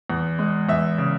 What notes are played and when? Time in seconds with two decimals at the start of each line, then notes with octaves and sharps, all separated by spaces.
0.10 E2
0.39 G#3
0.69 E2 E5
0.98 C#3